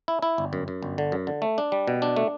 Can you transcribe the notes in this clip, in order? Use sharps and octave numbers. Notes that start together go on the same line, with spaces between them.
E4
E4
G1
F#2
F#2
G1
D3
F#2
D3
A3
D4
G3
B2
D4
A3